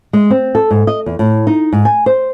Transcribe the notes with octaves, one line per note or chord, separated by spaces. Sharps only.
G#3
C4
A4
G#2
D#5
E2
A2
D#4
G#2
G#5
C5